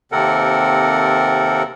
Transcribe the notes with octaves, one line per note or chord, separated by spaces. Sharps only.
D#2 C3 C4 A4 A#4 F#5